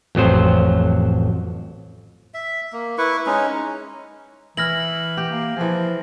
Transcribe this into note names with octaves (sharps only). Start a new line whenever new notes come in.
A1 F2 F#3 C5
E5
A#3
E4 B4 C#6
G#3 C#4 D#4
E3 E4 F6 A#6 F#7
G4
A#3
E3 F3 G#4